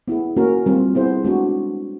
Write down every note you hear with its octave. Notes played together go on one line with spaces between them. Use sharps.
B3 E4 G#4
A#3 C#4 F#4 A#4
G3 C4 F4
B3 E4 G#4 C5
G#3 B3 D4 F#4